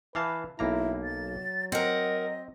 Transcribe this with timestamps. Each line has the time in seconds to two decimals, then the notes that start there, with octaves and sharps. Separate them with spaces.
0.15 E3 B4 F5 A5
0.59 B1 A#3 E4 A#5
1.04 F#3 A6
1.72 C4 A#4 D#5 F#5